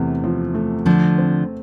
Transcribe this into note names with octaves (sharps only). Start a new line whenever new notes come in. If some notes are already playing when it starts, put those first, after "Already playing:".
Already playing: E2 C3 A3
F3
A3
D3 F3 A3
C4